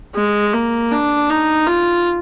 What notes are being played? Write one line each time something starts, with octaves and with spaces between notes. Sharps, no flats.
G#3
A#3
D4
D#4
F4